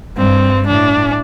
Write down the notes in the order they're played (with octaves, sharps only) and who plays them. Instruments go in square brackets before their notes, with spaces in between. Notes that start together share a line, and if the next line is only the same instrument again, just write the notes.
[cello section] G2 [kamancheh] C4
[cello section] A2 [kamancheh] D4